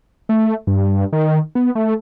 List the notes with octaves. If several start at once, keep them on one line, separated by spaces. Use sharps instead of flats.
A3
G2
D#3
B3
A3